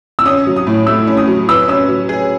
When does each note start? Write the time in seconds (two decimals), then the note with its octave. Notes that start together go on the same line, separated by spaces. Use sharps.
0.19 E6
0.25 C#4 D#6
0.47 F#3
0.56 D#6
0.67 A2
0.87 A3 E6
1.07 C#4
1.17 D#6
1.28 F#3
1.49 B4 E6
1.68 C#4 E6
1.88 F#3
2.09 G#4